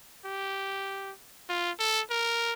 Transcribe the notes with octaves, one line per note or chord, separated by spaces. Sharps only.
G4
F4
A4
A#4